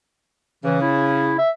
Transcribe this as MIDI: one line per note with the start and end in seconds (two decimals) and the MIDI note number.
0.64 1.37 49
0.64 0.80 52
0.81 1.34 64
1.38 1.50 76